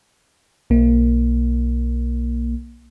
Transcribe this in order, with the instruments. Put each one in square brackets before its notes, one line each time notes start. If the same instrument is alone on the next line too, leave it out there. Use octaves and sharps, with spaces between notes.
[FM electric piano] B1 A#3